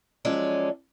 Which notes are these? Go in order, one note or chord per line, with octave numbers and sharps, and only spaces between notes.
F3 F#3 G#3 C#4 A4 D5